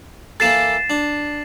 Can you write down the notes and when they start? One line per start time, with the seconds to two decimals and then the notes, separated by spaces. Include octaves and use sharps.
0.40 E3 A#3 A4 A6 C7 E7
0.90 D4